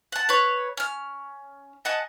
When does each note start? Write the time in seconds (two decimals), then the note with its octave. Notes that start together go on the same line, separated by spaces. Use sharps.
0.12 F#5 A5
0.29 B4 C#5
0.77 C#4 F6
1.85 D#5 F#5 G#5 A5